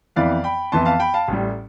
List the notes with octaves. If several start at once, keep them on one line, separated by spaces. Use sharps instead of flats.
F2 E3 B3 E4 D5 F5
G5 B5
F2 E3 B3 E4 A5 C6
F5 A5
G5 B5
F5 A5
A1 A2 G3